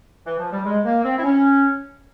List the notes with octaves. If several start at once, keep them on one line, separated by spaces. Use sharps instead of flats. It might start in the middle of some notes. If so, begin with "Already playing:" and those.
E3
F3
G3
G#3
A#3
C4
E4
C#4